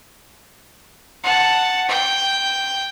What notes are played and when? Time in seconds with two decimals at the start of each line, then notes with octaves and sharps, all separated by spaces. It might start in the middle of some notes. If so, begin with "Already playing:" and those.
1.24 F#5 A5
1.89 G5